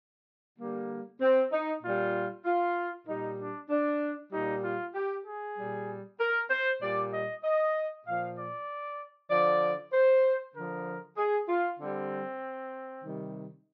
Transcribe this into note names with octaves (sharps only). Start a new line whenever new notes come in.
D3 G3 A#3
C4
D#4
A#2 F4
G3
F4
A#2 G3 D#4
D4
D4
A#2 G3 D#4
F4
G4
G#4
A#2 G3
A#4
C5
A#2 G3 D5
D#5
D#5
A#2 F3 F5
D5
D3 F3 D5
C5
D3 F3 A#4
G#4
F4
D3 G3 C4
C3 D#3 G3